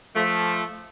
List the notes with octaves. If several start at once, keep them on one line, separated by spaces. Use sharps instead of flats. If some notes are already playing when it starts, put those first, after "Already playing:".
F3 A3